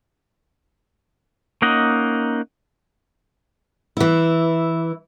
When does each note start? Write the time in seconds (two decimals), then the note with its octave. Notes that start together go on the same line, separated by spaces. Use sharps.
1.62 A#3 C#4 D#4 D#5 F#5
3.97 E3 E4